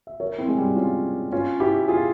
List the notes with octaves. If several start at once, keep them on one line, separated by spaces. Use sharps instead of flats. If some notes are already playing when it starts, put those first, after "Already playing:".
E5
A#4 C#5
C4 E4
G#3
G3
C#4 F4
C#4 F4
E4 G4
F4 G#4